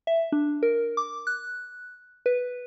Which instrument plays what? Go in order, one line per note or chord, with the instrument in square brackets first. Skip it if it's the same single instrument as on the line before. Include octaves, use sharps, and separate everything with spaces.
[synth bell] E5
D4
A#4
D6
F#6
B4